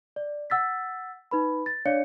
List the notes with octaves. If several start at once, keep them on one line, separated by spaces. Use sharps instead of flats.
D5
F#5 E6 A6 B6
D#4 B4 B5
A6
D4 C#5 D5 F5 C#7